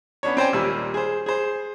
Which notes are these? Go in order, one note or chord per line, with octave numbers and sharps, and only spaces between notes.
B3 C#4 D4 C#5
C4 C#4 C5 D5 G5 G#5
D#2 A#2 G3 E6
G#4 C5
G#4 C5